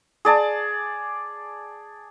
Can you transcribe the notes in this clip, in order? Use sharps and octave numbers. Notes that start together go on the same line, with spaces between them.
G#4 D5 A5